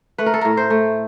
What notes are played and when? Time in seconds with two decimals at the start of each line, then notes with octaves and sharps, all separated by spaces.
0.18 A3 B4
0.26 A#4
0.34 A4
0.41 A2 A#4
0.57 C5
0.70 A3